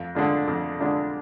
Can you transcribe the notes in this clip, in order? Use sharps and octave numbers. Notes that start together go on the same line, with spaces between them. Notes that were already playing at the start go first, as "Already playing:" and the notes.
Already playing: F2
D3 G#3 D4 F4
F2
D3 G#3 D4 F4